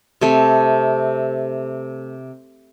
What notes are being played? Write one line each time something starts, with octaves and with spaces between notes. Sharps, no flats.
C3 A3